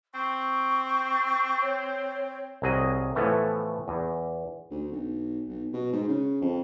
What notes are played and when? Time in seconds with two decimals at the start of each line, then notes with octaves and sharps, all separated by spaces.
0.14 C4 C#6
1.61 C#5
2.62 C2 F#3 G#4 D#5
3.15 A2 E3 F3 A3 B3
3.88 E2
4.71 D2
4.92 B1
5.49 B1
5.73 B2
5.92 G#2
6.08 C#3
6.41 F2